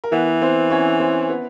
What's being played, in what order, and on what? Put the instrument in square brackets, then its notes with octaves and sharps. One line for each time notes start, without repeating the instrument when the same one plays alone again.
[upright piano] A#4
[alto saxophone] E3 [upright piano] B3 B4
[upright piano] C4 C5
C#4 C#5
C4 C5
B3 B4